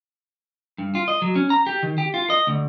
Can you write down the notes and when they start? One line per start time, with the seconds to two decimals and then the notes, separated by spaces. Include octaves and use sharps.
0.78 G2
0.95 F4
1.08 D#5
1.22 F#3
1.36 C#4
1.50 A#5
1.67 G4
1.83 D#3
1.98 G4
2.14 F4
2.30 D#5
2.47 D2